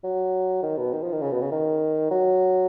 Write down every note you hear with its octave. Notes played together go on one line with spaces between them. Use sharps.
F#3
D#3
B2
D#3
F3
D#3
C#3
B2
C#3
D#3
F#3